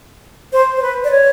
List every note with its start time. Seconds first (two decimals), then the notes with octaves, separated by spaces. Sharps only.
0.53 C5
0.77 C5
0.82 B4
1.04 D5
1.11 C#5